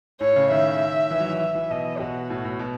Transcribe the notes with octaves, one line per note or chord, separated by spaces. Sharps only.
A2 C#5
C#3
D#3 E5
E3
F#3
E3
E5
E3
B2 D#5
B2 F#4
A2
A2
B2